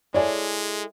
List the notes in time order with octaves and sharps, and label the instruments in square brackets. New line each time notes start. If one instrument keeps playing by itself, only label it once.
[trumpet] G#3 [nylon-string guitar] E4 G#4 A4 [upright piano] C#5 D5